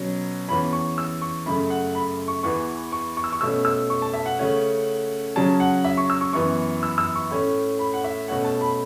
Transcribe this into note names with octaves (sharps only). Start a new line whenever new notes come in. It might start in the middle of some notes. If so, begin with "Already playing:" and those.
Already playing: B2 F#3 C#4
E2 E3 C#4 B5
C#6
E6
C#6
F#2 C#3 A3 B5
F#5
B5
C#6
E2 E3 B3 C#6
C#6
C#6
E6
C#6
B2 A3 C#4 E6
E6
C#6
A5
E5
F#5
C#3 A3 C#4
C#3 F#3 C#4 A5
F#5
E5
C#6
E6
C#6
F#2 E3 B3 C#6
E6
E6
C#6
A2 A3 C#4
B5
F#5
E5
B2 A3 C#4 F#5
A5
B5